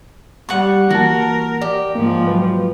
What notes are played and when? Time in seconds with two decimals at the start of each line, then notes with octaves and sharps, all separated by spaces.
0.49 G3 F#5 C#6
0.91 E3 A#3 F#4 A#4 A5
1.62 G4 D5
1.95 G#2 F3 A#3
2.27 F#3 B4